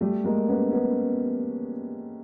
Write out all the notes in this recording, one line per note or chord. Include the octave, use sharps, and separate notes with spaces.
G3 A3
G#3 A#3
B3 C#4
B3 C#4